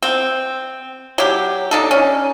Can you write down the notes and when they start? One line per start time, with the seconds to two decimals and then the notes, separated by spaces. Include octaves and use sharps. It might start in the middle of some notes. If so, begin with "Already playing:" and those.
0.03 C4
1.18 F#3 G4
1.71 D4 D#4 A4
1.91 C#4